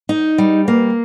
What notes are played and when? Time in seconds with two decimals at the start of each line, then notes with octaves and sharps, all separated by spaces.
0.09 D#4
0.38 G3
0.68 A#3